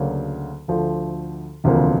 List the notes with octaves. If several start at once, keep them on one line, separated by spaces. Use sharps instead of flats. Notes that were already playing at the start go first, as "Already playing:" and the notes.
Already playing: D2 C#3 F#3 A#3 D4
D2 D3 F3 A3
E1 D2 C3 F3 A#3